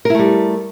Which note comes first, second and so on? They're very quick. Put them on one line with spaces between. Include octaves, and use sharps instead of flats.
A#4 E4 A3 G3